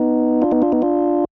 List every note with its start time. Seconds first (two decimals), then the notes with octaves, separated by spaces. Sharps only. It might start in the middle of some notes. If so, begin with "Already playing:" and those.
Already playing: B3 D#4
0.42 D4 F4
0.52 B3 D#4
0.62 D4 F4
0.72 B3 D#4
0.82 D4 F4